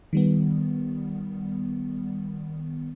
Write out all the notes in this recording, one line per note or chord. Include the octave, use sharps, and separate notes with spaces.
D#3 G3 B3